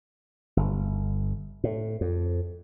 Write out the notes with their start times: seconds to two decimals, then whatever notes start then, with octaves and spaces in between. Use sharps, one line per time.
0.57 G1
1.64 A2
2.01 F2